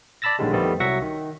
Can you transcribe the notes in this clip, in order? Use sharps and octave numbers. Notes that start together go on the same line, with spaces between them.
D5 A5 B5 E6 A6 A#6
A#1 A2 D3 D#3 G3 G#3
F2 D#3 G3 A3 B3 C4
C2 F#3 E5 F#5 C#6 A#6
D#3